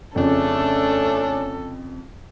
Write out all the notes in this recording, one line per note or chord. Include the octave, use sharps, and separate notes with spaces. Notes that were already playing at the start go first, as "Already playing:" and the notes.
F2 C#3 A3 C#4 D4 A4